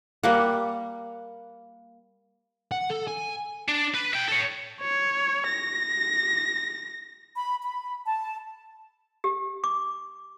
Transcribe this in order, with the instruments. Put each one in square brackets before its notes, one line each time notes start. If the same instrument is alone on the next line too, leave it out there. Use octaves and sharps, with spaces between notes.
[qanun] G3 A#3 F#5
[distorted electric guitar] F#5
A4
G#5
D4
B4
E5 G5
A4 C#5
[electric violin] C#5
A#6
[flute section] B5
B5
A5
[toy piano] G4
D6